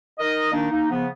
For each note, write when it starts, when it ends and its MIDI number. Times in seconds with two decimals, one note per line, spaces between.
0.19 0.50 63
0.19 0.50 70
0.19 0.50 75
0.52 0.71 51
0.52 0.71 58
0.52 0.71 62
0.52 0.71 63
0.71 0.90 58
0.71 0.90 63
0.91 1.07 49
0.91 1.07 53
0.91 1.07 59